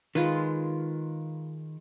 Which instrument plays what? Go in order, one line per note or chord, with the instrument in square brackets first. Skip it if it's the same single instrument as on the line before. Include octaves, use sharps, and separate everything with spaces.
[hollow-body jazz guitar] D#3 [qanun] G#3 F4 B4